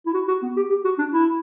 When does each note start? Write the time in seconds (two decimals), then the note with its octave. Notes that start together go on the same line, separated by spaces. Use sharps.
0.06 E4
0.14 F#4
0.28 F#4
0.42 B3
0.56 G4
0.70 G4
0.84 F#4
0.98 D4
1.13 E4